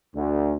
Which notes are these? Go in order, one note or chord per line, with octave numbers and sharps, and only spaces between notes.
D2